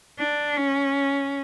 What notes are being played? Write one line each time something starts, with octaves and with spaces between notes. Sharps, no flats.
D4
C#4